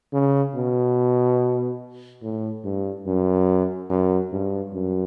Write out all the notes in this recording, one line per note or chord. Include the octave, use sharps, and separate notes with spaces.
C#3
B2
A2
G2
F#2
F#2
G2
F#2